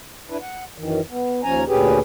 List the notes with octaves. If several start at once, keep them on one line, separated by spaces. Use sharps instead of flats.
D4 E4 B4
F#5
F#2 D#3 E3
B3
D#2 F3 C#4 G#5 A#5
D2 A#2 C#4 G4 G#4 B4